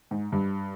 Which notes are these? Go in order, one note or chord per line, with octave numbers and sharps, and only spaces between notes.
G#2
G2